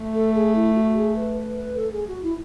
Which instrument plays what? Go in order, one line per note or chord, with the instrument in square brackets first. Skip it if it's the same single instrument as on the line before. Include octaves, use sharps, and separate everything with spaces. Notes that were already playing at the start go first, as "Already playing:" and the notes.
Already playing: [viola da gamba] A3
[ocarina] A4
G#4
E4
F#4
G#4
B4
B4
B4
A4
G#4
F#4
E4